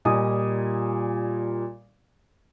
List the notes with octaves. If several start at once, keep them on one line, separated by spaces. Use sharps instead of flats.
A#2 G3 D#5 G#5 D#6